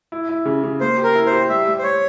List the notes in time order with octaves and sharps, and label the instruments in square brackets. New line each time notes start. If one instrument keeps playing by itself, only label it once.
[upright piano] E4
E4
C#3
C#3
[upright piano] A#3 [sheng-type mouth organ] C5
[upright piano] G4
[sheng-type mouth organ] A#4
[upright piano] E4
[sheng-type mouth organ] C5
[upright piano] G4
[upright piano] G3 [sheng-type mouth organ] E5
[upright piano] G3
[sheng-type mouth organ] C5
[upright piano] G3 [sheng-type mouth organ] C#5